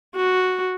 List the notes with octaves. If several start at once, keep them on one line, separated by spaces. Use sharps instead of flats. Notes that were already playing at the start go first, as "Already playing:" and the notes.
F#4